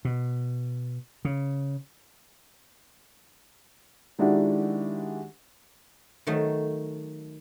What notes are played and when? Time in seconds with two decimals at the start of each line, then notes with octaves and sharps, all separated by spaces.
0.05 B2
1.25 C#3
4.19 D#3 G#3 D4 E4 F#4 G4
6.27 D#3 F#3 A3 D#4